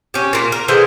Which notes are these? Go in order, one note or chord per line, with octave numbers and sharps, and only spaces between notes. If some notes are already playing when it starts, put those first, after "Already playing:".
C#4 G4
A#2 A#3
A#4
D3 E3 G#4 C5